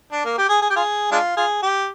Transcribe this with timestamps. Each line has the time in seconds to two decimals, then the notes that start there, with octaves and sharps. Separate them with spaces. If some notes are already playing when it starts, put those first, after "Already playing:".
0.12 D4
0.25 A#3
0.38 G4
0.49 G#4
0.61 G#4
0.70 G4
0.76 F4 G#4
1.11 G#3 D4 F4
1.37 F4 G#4
1.62 G4